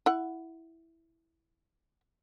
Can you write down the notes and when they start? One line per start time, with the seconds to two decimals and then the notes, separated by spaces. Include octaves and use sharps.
0.06 E4 F#5